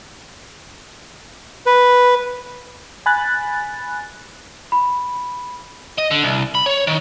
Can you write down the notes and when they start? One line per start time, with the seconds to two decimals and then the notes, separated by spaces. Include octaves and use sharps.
1.66 B4
3.06 G#5 B5 F#6 A6
4.72 B5
5.98 D#5
6.11 D3
6.23 C2
6.55 B5
6.66 C#5
6.87 D#3